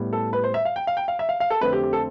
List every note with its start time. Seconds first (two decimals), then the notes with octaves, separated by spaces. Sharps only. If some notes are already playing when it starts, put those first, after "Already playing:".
Already playing: A2 G3 B3
0.13 A4
0.33 B4
0.44 C5
0.54 E5
0.65 F5
0.76 G5
0.87 F5
0.97 G5
1.08 F5
1.19 E5
1.29 F5
1.40 F5
1.50 A4
1.61 F2 D3 A3 C4 B4
1.73 G4
1.83 G4
1.93 A4